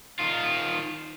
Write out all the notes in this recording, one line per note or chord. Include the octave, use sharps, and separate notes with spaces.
D#3 F4